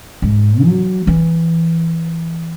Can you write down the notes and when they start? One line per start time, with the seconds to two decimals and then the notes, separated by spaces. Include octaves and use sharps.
0.22 G#2
0.64 F#3
1.07 E3